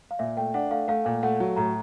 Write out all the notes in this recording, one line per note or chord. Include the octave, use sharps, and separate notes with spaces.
F5
A#2 E5
A3 G5
D4 F#5
A3 F5
A3 F5
A#2 F5
A3 F#5
F#3
A2 A#5